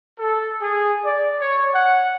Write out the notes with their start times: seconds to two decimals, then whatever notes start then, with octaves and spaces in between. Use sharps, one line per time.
0.19 A4
0.62 G#4
1.04 D5
1.41 C#5
1.74 F#5